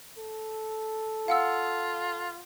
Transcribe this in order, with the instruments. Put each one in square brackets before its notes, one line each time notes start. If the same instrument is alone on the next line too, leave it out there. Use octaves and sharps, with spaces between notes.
[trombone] A4
[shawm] F4 [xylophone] F5 F#5 E6